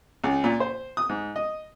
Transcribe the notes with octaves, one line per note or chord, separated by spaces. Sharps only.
C#2
A#2
C5
D#6
G#2
D#5